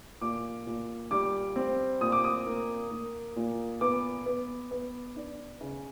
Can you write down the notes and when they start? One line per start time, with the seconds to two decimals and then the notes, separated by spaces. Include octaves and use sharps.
0.21 A#2 D6
0.66 A#2
1.11 G3 D6
1.56 C4
2.01 A#2 D#6
2.12 D6
2.24 D#6
2.46 A#3
2.91 A#3
3.36 A#2
3.81 B3 D6
4.26 B3
4.71 B3
5.16 D4
5.61 C#3